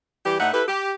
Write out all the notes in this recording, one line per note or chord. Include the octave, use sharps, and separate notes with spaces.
E3 G3 G4
A2 D#4 E4 F#5
E4 G4 A4 B4
G4